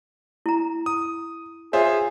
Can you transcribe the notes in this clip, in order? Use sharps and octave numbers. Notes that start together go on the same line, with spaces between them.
E4 A#5
D#6
F4 G#4 C5 C#5 E5